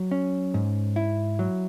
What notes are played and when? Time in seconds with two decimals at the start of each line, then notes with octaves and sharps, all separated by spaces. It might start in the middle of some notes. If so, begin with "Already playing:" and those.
Already playing: F#3
0.11 C#4
0.54 G#2
0.96 E4
1.39 F#3